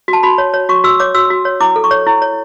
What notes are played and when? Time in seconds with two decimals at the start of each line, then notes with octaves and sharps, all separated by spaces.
0.08 F#4
0.13 A5
0.23 F#4 B5
0.38 C#5
0.54 C#5
0.69 F#4 C#6
0.84 F#4 E6
1.00 C#5 D6
1.15 F#4 E6
1.30 F#4
1.45 C#5
1.60 E4 D6
1.76 A4
1.84 C#6
1.91 C#5
2.07 E4
2.22 C#5